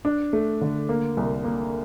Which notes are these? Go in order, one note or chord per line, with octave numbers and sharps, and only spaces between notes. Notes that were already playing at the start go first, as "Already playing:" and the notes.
D4
A3
D3
A#3
C2
A#3